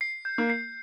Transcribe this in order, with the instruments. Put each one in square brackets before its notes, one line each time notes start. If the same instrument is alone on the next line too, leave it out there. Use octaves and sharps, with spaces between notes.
[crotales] C7
G6
[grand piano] A#3
[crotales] C7